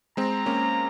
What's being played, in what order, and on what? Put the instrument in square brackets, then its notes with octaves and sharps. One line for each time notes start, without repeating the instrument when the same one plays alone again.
[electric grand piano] G#3 C4 [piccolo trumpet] A#5
[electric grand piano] A#3 C#4